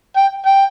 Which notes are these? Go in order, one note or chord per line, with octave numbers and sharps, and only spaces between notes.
G5
G5